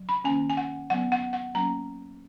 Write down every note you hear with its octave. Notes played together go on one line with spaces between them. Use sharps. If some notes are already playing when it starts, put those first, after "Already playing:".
Already playing: F#3
B5
D#3 A#3 C#4 G#5
G#5
F#5
F#3 B3 F#5
F#5
F#5
F#3 A#3 C#4 A#5